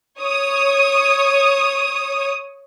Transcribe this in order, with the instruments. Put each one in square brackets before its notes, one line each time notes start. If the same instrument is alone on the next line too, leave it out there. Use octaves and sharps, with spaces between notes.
[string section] C#5 D#6